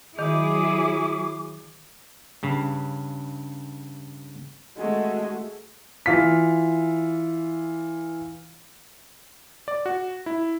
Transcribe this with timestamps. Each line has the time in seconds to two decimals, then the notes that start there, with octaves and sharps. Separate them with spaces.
0.19 D#3 F#3 E4 G#4 D6
2.43 G2 C#3
4.78 G#3 A3 F#4
6.06 E3 F4 B6
9.68 D5
9.86 F#4
10.26 E4